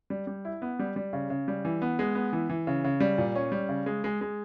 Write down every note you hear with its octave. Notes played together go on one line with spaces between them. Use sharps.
G3
G3
E4
B3
G3
G3
C#3
C#3
G3
E3
B3
G#3
B3
E3
E3
C#3
C#3
G3
A#2
C#4
G3
C#3
G#3
G#3
G#3